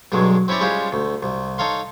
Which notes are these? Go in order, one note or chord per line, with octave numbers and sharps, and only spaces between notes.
B1 G2 F#3 G#3
C4 C#4 E4 C#5 D5
G3 G#3 C#4 F4 G4 C5
D2
C2
D#4 A4 C#5 F5 C6